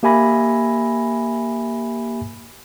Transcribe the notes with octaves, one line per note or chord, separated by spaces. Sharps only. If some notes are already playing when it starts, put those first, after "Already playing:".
A#3 G4 E5 G#5 B5 A#6